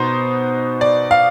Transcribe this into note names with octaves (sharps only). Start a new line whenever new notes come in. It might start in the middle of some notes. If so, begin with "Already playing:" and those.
Already playing: B2 B3 D#4 C5
D5
F5